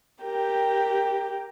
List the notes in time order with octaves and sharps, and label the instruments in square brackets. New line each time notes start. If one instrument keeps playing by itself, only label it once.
[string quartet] G4 A#4 G5